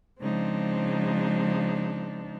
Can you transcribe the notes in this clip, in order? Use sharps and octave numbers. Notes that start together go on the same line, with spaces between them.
C#3 F3 G#3 C4 D4 D#4